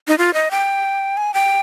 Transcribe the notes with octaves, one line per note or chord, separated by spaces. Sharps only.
D#4
F4
D#5
G5
G#5
G5